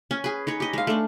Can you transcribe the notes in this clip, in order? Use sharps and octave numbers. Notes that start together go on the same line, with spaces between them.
C#4 G#5
G#4 B4
D#4 B4 C#5
G4 D#5
G#3 F5
A3 D4